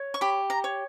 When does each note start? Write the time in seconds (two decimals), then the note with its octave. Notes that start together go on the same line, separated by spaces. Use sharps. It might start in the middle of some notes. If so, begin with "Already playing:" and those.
Already playing: C#5
0.14 C#6
0.21 G4 B5
0.50 A#5
0.64 C#5